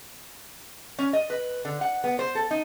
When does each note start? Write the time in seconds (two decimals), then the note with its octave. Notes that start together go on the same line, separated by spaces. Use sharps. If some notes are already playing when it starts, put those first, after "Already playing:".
0.99 C#4
1.13 D#5
1.30 B4
1.65 D3
1.81 F#5
2.04 B3
2.19 C5
2.35 A4
2.51 D#4